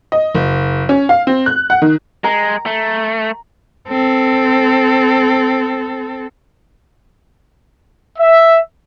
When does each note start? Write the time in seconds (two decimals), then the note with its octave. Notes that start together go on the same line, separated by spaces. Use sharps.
0.12 D#5
0.35 F#1
0.89 C#4
1.09 F5
1.27 C4
1.46 F#6
1.70 F#5
1.82 D#3
2.24 G#3 A#5
2.66 A3
3.89 C4 A4
8.19 E5